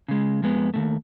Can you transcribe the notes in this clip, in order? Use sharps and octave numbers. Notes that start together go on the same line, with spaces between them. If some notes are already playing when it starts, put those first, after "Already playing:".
C#3 G#3
F2 G#3 B3
D#2 G#2 A3